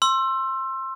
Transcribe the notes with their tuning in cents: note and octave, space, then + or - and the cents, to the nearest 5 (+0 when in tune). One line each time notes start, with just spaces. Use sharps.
C6 +20 E6 +20